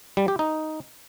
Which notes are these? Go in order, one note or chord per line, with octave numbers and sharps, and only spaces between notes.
G3
G4
D#4